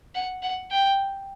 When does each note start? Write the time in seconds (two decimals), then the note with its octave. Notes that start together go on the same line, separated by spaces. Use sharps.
0.15 F#5
0.42 F#5
0.71 G5